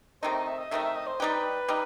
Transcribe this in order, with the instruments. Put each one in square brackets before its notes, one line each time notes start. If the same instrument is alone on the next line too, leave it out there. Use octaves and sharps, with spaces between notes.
[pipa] C3 D#3 A3 D#4 [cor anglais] C5
[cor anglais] D#5
E5
D#5
[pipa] C3 D#3 A3 D#4 [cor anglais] E5
[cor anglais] E5
D#5
C5
[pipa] G3 D#4 G4 [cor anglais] B4
[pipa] G3 D#4